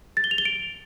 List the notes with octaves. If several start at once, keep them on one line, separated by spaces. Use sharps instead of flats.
A6
G7
F7
G7
D7